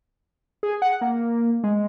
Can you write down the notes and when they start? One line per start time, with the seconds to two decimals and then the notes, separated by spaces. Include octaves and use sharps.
0.63 G#4
0.82 F#5
1.01 A#3
1.64 G#3